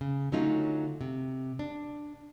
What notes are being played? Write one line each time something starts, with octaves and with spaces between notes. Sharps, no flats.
C#3
D3 F#3 A3 C#4 D#4 F4
C3
D4